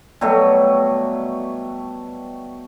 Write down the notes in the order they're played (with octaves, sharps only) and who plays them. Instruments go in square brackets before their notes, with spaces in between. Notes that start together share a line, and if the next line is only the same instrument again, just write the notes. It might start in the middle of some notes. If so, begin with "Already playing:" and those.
[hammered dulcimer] B2 F#3 G3 A3